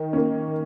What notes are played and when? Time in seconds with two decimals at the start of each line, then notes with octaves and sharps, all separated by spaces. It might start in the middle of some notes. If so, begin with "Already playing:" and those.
Already playing: D#3
0.13 A#3 C#4